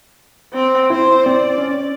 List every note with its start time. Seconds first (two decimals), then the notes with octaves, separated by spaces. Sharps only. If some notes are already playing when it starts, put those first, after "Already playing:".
0.53 C4
0.90 C4 E4 C5
1.26 C4 D5
1.58 C#4